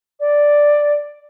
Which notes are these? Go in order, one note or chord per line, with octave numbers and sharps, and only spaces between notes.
D5